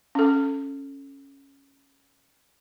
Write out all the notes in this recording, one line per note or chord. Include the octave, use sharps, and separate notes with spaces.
C#4 A4